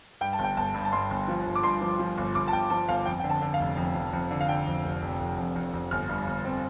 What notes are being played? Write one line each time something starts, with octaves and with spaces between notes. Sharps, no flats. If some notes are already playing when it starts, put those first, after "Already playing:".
G2 G5
A5
G1
G5
G1 A5
G2
A5
G2 C6
G1
F3
G1
D6
G2 C6
F3
F3
G1
G1 D6
A5
G1 G5
F3 A5
G1 F5
F2 G5
D3 G5
A5
D3
F5
F1
F2
F2
F2
D3
F5
D3 G5
F2
F1
F1
F1
F2
F2
F2
G1 F6
G2
G1
C4